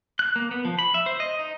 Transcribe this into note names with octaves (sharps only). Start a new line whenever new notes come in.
F#6
A#3
B3
F3
B5
E5
C5
D#5
D#4